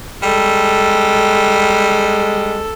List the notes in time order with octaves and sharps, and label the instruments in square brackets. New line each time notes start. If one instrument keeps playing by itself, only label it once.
[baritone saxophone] G3 [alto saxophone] G#3 [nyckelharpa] A4